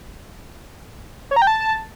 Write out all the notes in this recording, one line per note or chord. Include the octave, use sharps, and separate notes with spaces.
C#5
A#5
G5
A5